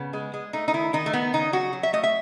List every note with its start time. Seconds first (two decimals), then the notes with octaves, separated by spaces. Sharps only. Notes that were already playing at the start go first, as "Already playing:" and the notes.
Already playing: C#3 B3
0.13 G#3
0.34 G#3
0.53 A3 D#4
0.68 D#4
0.73 D#3 E4
0.93 D#3 D#4
1.06 A3
1.13 D#3 B3
1.33 C#3 D#4
1.53 F#3 F#4
1.73 F#3
1.83 E5
1.93 A3 D#5
2.03 E5